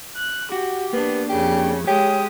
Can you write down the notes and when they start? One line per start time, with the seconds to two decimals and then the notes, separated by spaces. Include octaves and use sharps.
0.16 F#6
0.52 F#4 G4
0.93 A#3 B3 D4
1.29 F2 C#3 G4
1.87 G#3 G4 C#5 D#6